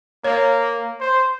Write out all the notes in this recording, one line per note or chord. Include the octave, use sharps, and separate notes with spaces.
A#3 C#5
C5